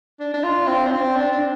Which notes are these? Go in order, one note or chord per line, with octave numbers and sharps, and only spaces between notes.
D4
D4
F4
C4
D4
C4
D4
D4